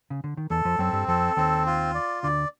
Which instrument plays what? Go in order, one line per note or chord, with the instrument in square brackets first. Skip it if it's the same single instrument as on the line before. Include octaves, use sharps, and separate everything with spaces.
[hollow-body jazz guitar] C#3
D3
D#3
[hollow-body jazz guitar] E2 E3 [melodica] A4
[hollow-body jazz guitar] F2 F3
[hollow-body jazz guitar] F#2 F#3 [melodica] C4
[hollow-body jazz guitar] G2 G3
[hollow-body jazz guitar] F2 F3 [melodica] A4
[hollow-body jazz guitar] D#2 D#3 [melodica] C4
[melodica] F4
D5
[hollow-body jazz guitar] D2 D3 [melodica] D5